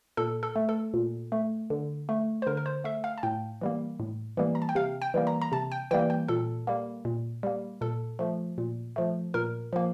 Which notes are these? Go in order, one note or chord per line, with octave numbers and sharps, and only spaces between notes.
A#2 A4
A4
A3
A4
A#2
A3
D3
A3
C5
D3 A#4
A#4
C5
A3 E5
F5
A5
A2 G5
E3 G3 A#3
A2
E3 G3 A#3
A#5
A5
G5
C3 F5
G5
E3 G3 A#3
A#5
A#5
C3 A5
G5
E3 G3 A#3 G5
G5
A#2 A4
G3 A#3
A#2
G3 A#3
A#2 A4
F3 A3
A#2
F3 A3
A#2 A#4
F3 A#3